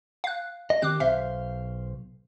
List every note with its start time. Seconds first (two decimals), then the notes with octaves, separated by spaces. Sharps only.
0.24 F5 F#6
0.70 D#5
0.82 D#3 C4 G4 D6 F#6
1.00 B1 C5 E5 F5